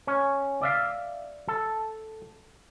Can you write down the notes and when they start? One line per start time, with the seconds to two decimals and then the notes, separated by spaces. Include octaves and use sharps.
0.07 C#4
0.61 D5 E5 F5
1.48 A4